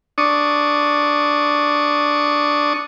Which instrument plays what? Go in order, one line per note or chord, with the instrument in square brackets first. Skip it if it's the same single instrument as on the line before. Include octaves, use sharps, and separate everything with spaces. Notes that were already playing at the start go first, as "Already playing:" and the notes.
[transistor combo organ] D4 C#6 D#6